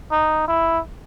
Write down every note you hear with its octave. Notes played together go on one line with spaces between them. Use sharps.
D#4
E4